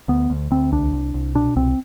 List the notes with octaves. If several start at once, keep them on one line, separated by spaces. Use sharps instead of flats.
D2 B3
D2
D2 C4
C2 D4
C2
C2
B2 D4
C2 C4